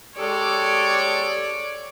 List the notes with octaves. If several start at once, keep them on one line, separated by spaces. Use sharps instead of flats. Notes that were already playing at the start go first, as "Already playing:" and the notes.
G#3 G4 A4 C#5 D5 D6